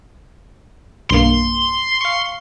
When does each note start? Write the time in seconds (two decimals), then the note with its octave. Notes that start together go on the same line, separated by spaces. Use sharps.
1.10 B1 G2 A#3 C6
2.01 F5 C#6